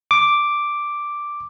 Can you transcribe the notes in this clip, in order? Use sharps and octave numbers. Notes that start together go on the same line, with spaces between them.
D6